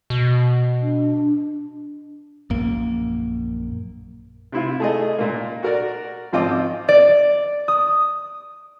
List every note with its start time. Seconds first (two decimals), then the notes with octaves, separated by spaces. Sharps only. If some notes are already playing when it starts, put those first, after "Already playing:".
0.10 B2
0.81 D4
2.50 A#1 F#2 A#3
4.52 C3 E4 F4
4.80 A3 G#4 D#5
5.18 A#2 A#3
5.63 F#4 A#4 D5
6.33 G#1 F3 C4 F4 D#5 D6
6.89 D5
7.68 D#6